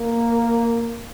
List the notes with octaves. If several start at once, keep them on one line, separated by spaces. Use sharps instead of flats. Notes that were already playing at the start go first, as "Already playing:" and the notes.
Already playing: A#3